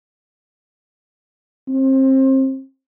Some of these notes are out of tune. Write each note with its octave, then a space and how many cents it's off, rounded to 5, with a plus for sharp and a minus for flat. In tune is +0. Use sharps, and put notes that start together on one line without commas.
C4 +30